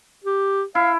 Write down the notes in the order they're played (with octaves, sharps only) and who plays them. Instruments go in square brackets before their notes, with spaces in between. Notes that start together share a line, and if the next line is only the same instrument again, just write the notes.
[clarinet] G4
[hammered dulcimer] E4 [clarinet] F5